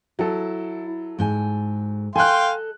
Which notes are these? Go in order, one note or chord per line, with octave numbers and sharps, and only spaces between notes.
F#3 E4 A4
G#2 G5 G#5
A4 D#5 F5 G5 G#5 C6 F#6